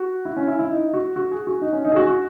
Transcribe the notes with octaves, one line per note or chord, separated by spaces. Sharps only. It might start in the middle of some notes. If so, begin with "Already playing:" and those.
Already playing: F#4
E4
C#4
E4
E4
D#4
F#4
F#4
G#4
F#4
D#4
C#4
D#4
G#4
F#4
F#4